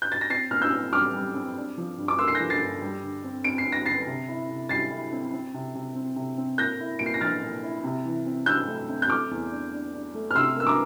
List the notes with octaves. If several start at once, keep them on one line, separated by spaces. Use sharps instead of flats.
G6
A6
A#6
C4 A6 C7
A#2 F6
E6 G6
C4
G3 D6 F6
G3
C4
D4
F3
G2
D6
A#3 C6 E6
C7
G6 A#6
F3
A6 C7
G2
G3
D3
C4
C4 D7
C7
C4
A#6
D3 A6 C7
C3
E4
C3
G3 A6 C7
E4
C4
C4
C3
C3
C4
C3
C4
A#3 G6 A#6
E4
A#2 D7
C7
A#6
F3 F6 A6
A#2
E4
C3
E3
C4
C4 E6 G6
A3
C4
G6
A3 D6 F6
E2
D4
D4
D4
A3
F6
C3 C6 E6
A#3 E6
A#5 D6